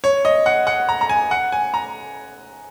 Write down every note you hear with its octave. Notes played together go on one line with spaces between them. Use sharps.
C#5
D#5
F#5
F#5
A#5
A#5
G#5
F#5
G#5
A#5